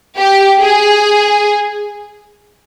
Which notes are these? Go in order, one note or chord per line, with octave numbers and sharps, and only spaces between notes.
G4
G#4